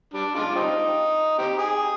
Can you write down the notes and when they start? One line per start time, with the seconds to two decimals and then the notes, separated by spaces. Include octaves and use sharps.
0.14 G3 D4
0.35 G#3 D4 F4
0.51 D4
0.55 G3 C4 D#4
1.38 C4 D#4 G4
1.59 G#4